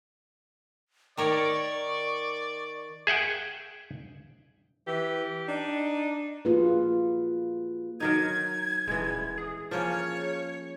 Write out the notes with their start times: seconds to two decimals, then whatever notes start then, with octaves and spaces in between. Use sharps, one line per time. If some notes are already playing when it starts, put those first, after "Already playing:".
1.17 D#3 A#4 C#5 D5 C#6
3.07 G#4 E5 F#5 G5
4.87 E3 G4
5.48 D4 D#4
6.45 A#3 F4 F#4 G#4 B4
8.00 D#3 F#3 D#4 G#6
8.88 D#1 E3 G#3
9.38 G#4
9.71 F3 A#3 C#4 C#5